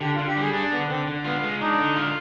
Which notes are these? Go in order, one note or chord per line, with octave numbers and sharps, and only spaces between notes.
D3 G4
D3 F4
G4
G3 G#4
D4 G#4
D3 B3
D3 C4
D3
B3 F4
G#3
D4 D#4
D3
F4